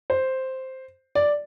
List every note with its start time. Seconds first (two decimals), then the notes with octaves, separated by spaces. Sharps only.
0.10 C5
1.15 D5